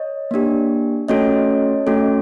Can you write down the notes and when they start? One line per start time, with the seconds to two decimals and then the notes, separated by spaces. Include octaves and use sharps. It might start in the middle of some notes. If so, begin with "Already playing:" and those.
Already playing: C#5 D#5
0.31 A#3 D4 G4
1.08 A3 C#4 F#4 A4 C#5 D#5
1.87 A3 C#4 F#4 A4